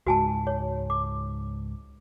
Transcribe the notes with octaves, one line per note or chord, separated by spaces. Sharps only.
C#2 G#2 F#4 G#5 A5
C#5
D6